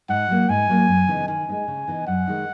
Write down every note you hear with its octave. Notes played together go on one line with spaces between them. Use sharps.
G#2 F#5
F#3 A#3
G#2 G#5
F#3 A#3
F#2
C#3 E3 B3 D#4
D#3 G#5
G#3 B3 D#4
C#3
E3 B3 D#4
F#2 F#5
D#3 G#3 D#4